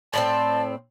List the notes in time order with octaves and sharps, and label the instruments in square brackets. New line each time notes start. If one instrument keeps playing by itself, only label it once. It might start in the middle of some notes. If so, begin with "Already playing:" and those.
[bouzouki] A2 A#3 C4 [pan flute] D5 [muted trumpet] A5